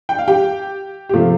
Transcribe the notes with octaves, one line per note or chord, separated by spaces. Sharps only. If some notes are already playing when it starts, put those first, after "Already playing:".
G5
F5
G4 G5
G4
C3 F3 A3 F4